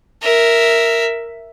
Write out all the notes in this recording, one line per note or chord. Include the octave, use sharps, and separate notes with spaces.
A#4 E5